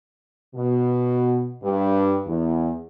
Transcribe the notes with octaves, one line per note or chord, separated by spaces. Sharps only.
B2
G2
E2